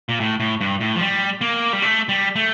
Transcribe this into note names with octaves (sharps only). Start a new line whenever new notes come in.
A#2
A2
A2
G2
A2
F3
G3
A#3
G3
A3
G3
A3